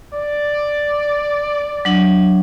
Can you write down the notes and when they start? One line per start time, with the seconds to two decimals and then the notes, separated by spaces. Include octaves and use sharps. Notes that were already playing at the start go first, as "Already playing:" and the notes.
0.14 D5
1.85 F#3 D4